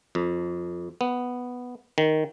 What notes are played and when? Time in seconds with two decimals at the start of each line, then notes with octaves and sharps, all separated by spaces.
0.15 F2
1.01 B3
1.98 D#3